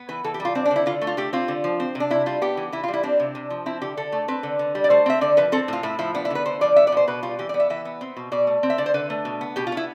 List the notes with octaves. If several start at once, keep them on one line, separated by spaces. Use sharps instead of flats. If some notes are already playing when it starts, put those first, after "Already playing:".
Already playing: B3
E3 B4
E3 A4
G4
G3
F4
C4 D4
D4
D3
E4
D3 F4
A3
F4
A3 G4
C4 F4
D3
F3
C4
C3
D4
C3 E4
G3 F4
B3 G4
E3
E3 E4
F4
G3
E4
C4 D4
C3
C3
F3
C4 E4
D3 G4
D3 A4
A3
C4 B4
D3
D3
G3
D5
A3 C5
C4 E5
D3 D5
F3 B4
C4 A4
A2 F4
A2 E4
F3 E4
B3 D4
E4
D3 B4
D3 C5
F3 D5
B3 E5
D5
B2 C5
B2 B4
G3 F4
E3 G4
D5
B3
E5
E3 E5
B3
C4
B2
B2 D5
A3
C4
E5
D3 D5
C5
D3 B4
A3
B2
B3
B2 G4
F4
B3
E4